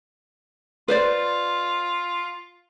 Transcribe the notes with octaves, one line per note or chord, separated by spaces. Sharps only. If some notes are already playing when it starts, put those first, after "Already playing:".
F4 B4 C5 D5